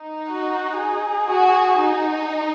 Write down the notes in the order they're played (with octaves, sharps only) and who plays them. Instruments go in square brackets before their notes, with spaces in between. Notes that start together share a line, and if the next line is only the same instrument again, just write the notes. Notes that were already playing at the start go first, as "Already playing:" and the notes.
Already playing: [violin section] D#4
[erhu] F#4
G#4
[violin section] F#4
D#4